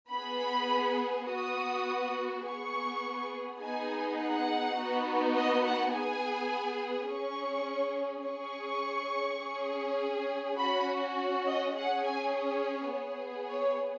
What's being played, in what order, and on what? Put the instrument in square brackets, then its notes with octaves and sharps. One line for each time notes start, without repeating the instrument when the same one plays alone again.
[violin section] B3 G#4 B5
B3 F#4 D#6
B3 G#4 C#6
B3 D#4 G#4 G#5
F#5
B3 D#4 F#4
D#5
F#5
B3 G#4 G#5
C#4 G#4 C#6
C#4 G#4 C#6
C#4 G#4
C#4 F#4 B5
D#5
C#4 G#4 F#5
G#5
C#5
B3 G#4
C#5